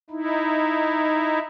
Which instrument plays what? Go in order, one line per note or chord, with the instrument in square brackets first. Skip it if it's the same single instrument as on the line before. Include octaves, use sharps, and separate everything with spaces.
[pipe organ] D#4 E4